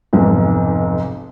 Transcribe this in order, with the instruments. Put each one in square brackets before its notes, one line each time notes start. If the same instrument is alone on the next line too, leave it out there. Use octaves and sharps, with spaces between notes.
[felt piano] F1 B1 G#2